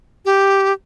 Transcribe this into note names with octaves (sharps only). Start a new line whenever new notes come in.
G4